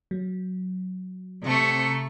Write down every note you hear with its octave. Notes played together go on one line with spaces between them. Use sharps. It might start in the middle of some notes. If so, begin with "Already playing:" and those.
F#3
C3 A3 C#6